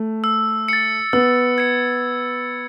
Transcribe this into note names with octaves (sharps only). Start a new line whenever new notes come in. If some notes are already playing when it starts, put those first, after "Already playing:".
Already playing: A3
E6
A6 C#7
B3 E6
G#6 C#7